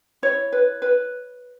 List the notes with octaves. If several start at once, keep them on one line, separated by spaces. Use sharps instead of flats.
E4 C#5
B4
B4